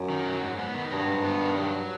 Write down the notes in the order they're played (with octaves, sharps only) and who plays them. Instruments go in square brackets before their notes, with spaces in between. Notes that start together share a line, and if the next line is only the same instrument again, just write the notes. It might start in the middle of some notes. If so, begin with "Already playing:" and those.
Already playing: [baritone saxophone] F#2
[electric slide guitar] D#3
F#3
G#2
B3
D#3
[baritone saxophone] G2 [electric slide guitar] F#3
[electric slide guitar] G#2
B3
D#3
F#3